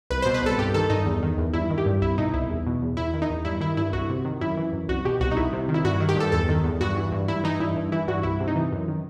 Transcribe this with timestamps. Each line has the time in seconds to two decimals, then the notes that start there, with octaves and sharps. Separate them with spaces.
0.10 C2 B4
0.22 B2 C5
0.34 B4
0.42 C2 A4
0.58 G2 G4
0.74 D#3 A4
0.90 G2 D#4
1.06 E2
1.22 D#3
1.38 E2
1.54 G2 E4
1.70 D#3
1.78 G4
1.86 G2
2.01 C2 E4
2.18 B2 D#4
2.34 C2 E4
2.50 E2
2.66 B2
2.82 E2
2.97 E2 E4
3.14 D#3
3.22 D#4
3.30 E2
3.45 G2 E4
3.61 D#3 E4
3.77 G2 E4
3.93 C2 F#4
4.09 C3
4.25 D#3
4.41 F#2 E4
4.57 E3
4.73 F#2
4.88 C2 F#4
5.05 B2 G4
5.20 C2 F#4
5.31 D#4
5.37 C2 E4
5.53 C3
5.69 D#3
5.74 E4
5.84 G2 F#4
6.00 D#3
6.09 G4
6.16 G2 A4
6.32 E2 A4
6.49 D#3
6.64 E2
6.81 G2 F#4
6.96 E3
7.12 G2
7.28 G2 E4
7.44 E3 D#4
7.60 G2 E4
7.76 G2
7.92 E3 E4
8.07 G2 F#4
8.23 C2 E4
8.40 C3
8.48 D#4
8.56 E3
8.72 F#2
8.88 D#3